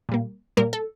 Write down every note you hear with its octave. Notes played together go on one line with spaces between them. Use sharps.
A#2 G3 A#3
A#2 G3 A#3 A#4
A4